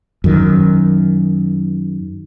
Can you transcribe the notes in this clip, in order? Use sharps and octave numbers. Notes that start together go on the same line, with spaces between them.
F#2 D#3